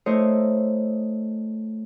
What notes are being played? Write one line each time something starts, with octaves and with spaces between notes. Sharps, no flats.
A3 E4 A#4 C5 C#5 D#5